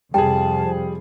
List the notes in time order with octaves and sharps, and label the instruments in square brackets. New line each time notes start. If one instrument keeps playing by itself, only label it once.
[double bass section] F2 C3 F3 [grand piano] G3 G#4 [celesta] G5 [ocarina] A5